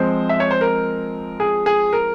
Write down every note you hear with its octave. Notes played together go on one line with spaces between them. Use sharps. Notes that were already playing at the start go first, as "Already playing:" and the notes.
Already playing: F3 G#3 C4 C5
E5
C#5
C5
A#4
G#4
G#4
A#4